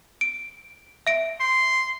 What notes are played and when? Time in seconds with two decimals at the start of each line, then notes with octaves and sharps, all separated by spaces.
0.21 D7
1.07 E5 D7
1.40 C6